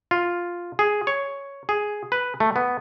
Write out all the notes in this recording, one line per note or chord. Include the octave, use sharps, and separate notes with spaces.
F4
G#4
C#5
G#4
B4
A3
B3